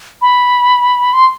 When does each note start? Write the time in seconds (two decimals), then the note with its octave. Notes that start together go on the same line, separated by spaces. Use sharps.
0.22 B5
1.13 C6